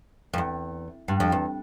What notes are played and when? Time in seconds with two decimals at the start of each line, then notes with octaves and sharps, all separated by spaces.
0.34 F2
0.38 E2
1.08 G2
1.20 F2
1.32 E2